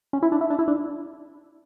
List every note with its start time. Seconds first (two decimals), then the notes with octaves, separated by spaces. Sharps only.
0.13 C#4
0.22 E4
0.32 D4
0.41 E4
0.50 D4
0.59 E4
0.68 D4